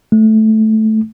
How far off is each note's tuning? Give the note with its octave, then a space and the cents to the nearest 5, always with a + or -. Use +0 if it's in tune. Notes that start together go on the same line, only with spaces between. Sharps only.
A3 -10